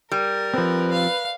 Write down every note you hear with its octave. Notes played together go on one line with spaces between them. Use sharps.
G3 A#4
F3 C4 B4
F5